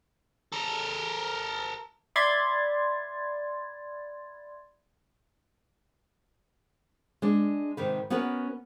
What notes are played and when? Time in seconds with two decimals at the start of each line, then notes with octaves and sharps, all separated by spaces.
0.53 A4 A#4
2.16 D5 E5 B5 C6 G#6 A6
7.22 G#3 D4
7.77 G#2 C3 D#3 B4
8.10 B3 C#4 F#4 A#4 B4